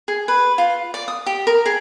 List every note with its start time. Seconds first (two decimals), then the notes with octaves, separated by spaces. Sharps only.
0.08 G#4
0.28 B4
0.58 F4
0.94 D5
1.08 D#6
1.26 G4
1.47 A#4
1.66 G#4